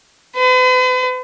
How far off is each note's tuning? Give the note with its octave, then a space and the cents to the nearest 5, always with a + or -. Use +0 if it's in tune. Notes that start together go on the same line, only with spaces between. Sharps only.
B4 +45